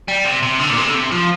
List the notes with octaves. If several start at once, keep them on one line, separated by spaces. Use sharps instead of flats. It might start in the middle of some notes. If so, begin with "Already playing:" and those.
G3
C3
C3
D3
A#2
C3
D3
C3
F3